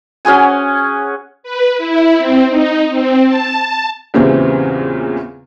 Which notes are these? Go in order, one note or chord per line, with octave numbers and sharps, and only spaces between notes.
C#4 F#4 G#4 G#5
B4
E4
C4
D#4
C4
A5
E2 A#2 C#3 E3 G3 C4